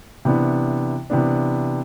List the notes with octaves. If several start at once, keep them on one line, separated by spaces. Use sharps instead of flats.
C3 E3 B3 D4
C3 E3 B3 D4